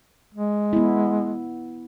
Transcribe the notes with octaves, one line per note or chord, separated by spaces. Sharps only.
G#3
B3 E4